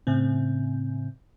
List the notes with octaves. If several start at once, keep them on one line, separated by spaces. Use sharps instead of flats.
A2 C#3 C4